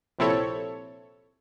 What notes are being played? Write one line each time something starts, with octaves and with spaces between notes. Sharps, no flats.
A#1 C3 C4 E4 A4 C#5